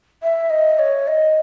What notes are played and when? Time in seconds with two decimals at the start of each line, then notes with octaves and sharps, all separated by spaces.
0.23 E5
0.50 D#5
0.79 C#5
1.08 D#5